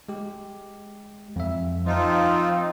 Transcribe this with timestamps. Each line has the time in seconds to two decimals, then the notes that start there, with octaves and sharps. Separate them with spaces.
0.09 G#3 G4
1.36 F2 E5
1.86 F3 C4 D#4 F4 A5